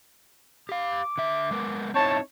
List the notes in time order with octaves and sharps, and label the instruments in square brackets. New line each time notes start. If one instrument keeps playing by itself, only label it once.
[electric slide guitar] G4 F5 [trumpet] D6
[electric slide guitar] D3 E5
G#3 B3 A#4
[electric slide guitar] C4 D#4 E4 [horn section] C#5 A5